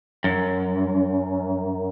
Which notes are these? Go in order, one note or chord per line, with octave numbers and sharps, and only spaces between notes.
F#2